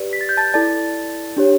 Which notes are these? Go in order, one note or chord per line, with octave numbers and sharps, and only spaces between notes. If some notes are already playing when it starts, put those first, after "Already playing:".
Already playing: G4 B4 D5
B6
A6
G6
A5 A6
E4 A4 D5 A5 A6
D4 G4 C#5